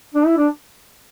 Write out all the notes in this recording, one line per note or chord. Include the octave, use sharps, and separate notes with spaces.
D4
E4
D4